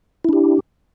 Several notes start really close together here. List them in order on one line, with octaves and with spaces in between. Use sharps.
E4 D4 G4